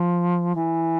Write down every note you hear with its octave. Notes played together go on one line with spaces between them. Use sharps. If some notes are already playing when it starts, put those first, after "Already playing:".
Already playing: F3
E3